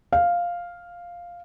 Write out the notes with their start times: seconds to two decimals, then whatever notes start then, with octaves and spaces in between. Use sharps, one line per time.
0.12 F5